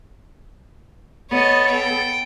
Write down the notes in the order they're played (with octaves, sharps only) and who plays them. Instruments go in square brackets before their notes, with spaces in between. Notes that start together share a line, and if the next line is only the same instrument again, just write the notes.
[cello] B3 A4 [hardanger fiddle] C#5 D#5
[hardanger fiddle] G5